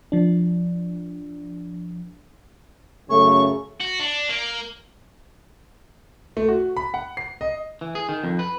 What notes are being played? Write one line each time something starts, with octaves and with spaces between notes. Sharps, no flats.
F3 D4
F#2 C#3 A3 C#6
F#4
D4
A#3
A3
F#4
B5
F#5
C7
D#5
E3
G#4
D#3
F2
B4